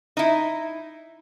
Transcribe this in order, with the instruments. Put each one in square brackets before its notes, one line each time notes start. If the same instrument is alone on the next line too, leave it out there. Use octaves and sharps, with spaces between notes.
[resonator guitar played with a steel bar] D#4 E4